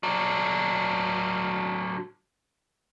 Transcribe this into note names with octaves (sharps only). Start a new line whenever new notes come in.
F#3 D4